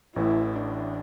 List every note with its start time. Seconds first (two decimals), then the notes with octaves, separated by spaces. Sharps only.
0.15 A1 A2 E3 A3 E4
0.56 D4